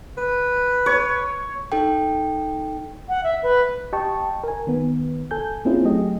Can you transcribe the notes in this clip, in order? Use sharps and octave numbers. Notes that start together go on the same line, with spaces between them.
B4
C#5
D#4 A4 G5
F#5
E5
B4
G4 D#5 G5 A5 C#6
A#4 G#5
D#3 B3
A4 G#5 G6
A#3 C4 C#4 E4 F4 G#4
F#3 A3 G4 G#4 D#5